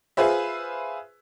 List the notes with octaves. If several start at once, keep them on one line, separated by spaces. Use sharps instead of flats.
F4 G#4 B4 C5 E5